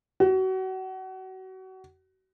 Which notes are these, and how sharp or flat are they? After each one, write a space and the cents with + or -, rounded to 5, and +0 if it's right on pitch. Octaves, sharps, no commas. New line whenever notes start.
F#4 +30